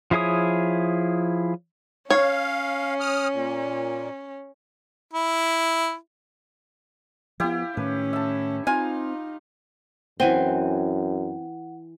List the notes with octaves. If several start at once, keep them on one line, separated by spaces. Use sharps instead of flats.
F3 E4 G#4 C#5 D#6
C#4 C#5 F5
D#6 F6
A#2
E4
F3 B3 E4 G4 F5
A2 D#3 C#4 B4
E5 A5
C4 D#4 F4 F5 G#5 A#5
F#2 E3 C4 F#5 G#5 C6